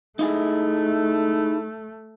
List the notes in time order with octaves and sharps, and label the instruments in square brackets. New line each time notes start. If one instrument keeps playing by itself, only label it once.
[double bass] A3 [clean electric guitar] D#4 E4 G#4